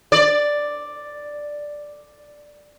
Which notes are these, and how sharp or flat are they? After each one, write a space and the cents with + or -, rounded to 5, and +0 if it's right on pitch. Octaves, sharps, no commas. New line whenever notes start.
D5 +5